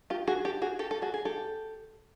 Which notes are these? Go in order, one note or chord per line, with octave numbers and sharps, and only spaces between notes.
F4 G4
F#4 G#4
G4 A4
F#4 G#4
G4 A4
A4
F#4 G#4
G#4
G4 A4